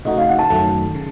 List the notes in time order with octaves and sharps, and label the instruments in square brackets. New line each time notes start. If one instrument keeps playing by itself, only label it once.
[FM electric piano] C#3 A3 D#4 F#4 [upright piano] D#5
[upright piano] F5
F#5
A5
[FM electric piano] F#2 D#3 F#3 A3
C#3